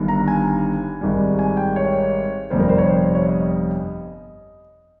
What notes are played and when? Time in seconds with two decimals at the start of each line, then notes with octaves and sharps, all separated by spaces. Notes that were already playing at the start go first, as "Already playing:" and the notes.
Already playing: G1 G2 D#3 G3
0.08 A#5
0.28 G#5
1.01 G#1 G#2 G3
1.39 G#5
1.57 G5
1.76 C#5
2.50 G1 F2 C3 G3 C5
2.60 A#4
2.69 C5
2.78 C#5
2.87 C5
3.15 C#5
3.25 D#5